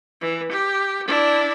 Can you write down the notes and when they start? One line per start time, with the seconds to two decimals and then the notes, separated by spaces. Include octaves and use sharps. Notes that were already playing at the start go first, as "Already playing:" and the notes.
0.21 E3
0.51 G4
1.07 D4 E4